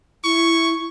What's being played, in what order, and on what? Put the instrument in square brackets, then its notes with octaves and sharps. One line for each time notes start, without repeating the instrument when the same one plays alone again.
[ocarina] E4 [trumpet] C#6